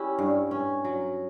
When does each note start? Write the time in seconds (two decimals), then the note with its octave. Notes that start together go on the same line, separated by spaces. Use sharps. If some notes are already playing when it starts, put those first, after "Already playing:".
Already playing: C#4 E4 G4
0.19 G2
0.51 C#4
0.85 F#3